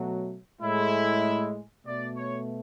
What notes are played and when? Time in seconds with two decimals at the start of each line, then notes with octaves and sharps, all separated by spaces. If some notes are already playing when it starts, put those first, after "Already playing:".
Already playing: B2 F#3 A3
0.61 A2 G#3 E4
1.85 B2 A3 D5
2.16 C#5